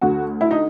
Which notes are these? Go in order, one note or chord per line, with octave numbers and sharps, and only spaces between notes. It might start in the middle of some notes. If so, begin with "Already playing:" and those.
D2 D3 F#4
E4
D#4